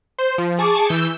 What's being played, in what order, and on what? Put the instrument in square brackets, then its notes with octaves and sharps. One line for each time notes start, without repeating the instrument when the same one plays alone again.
[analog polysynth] C5
F3
G#4 A5 C#6 D6
E3 E6 G6